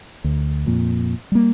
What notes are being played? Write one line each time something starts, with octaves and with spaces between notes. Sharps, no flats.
D2
F2 A#2
G3 A#3